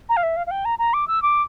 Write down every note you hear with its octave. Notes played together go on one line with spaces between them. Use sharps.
A#5
F5
E5
F5
F5
G5
A#5
A#5
D6
E6
D6